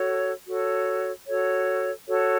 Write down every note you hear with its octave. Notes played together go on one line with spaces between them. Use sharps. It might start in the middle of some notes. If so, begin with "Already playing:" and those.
Already playing: F#4 A4 C#5
F#4 A4 C#5
F#4 A4 C#5
F#4 A4 C#5